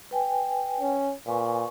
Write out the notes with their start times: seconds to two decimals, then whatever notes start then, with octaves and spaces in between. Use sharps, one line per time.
0.11 B4 G5 G#5
0.81 C#4
1.27 A#2 B4 G#5 C#6